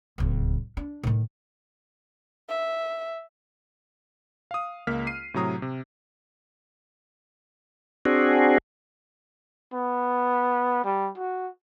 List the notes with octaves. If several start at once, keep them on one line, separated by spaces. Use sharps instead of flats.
D1 C#2
D4
A2 D#3
E5
F5 D#6
C#2 A#3 F6 B6
C7 D#7
A2 C3 F#3 A#5 D#6
C3
C4 D4 F#4 G#4
B3
G3
F#4